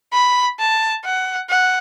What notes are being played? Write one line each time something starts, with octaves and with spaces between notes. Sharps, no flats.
B5
A5
F#5
F#5